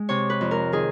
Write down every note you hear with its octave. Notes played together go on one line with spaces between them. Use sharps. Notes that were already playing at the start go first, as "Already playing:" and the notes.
Already playing: G#3
C3 C#5
B4
F2
A#4
D#3 G#4